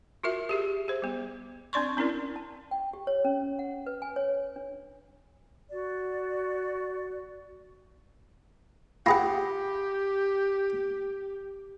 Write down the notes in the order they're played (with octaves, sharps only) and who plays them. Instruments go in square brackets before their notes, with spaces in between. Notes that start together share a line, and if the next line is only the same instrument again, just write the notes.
[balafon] F4 F#4 A#4 E5
G4 G#4 E5
G#4 C5
G3 B3
C4 D4 D5 C6 C#6
C4 C#4 E4 A#4 D5
[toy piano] A5
G5
G4
C#5
C#4
F#5
B4
G#5
C#5
D4
[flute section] F#4 D5
[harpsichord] F4 G#4 F#5 [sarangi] G4 [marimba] G5 B5 A#6